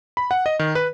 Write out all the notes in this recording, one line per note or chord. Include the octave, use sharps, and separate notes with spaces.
B5
F#5
D#5
D#3
B4